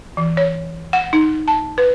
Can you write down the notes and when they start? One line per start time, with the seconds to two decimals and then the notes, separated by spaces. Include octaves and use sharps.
0.17 E3
0.37 C#5
0.93 F#5
1.13 D#4
1.48 A5
1.78 B4